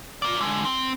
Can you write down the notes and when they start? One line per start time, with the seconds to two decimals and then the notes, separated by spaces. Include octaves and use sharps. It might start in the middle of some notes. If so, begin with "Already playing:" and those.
0.22 F4 D5
0.41 D3 G#3
0.65 C4